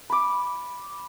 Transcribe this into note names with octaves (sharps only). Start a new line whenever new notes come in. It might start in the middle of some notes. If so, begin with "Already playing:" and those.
B5 D6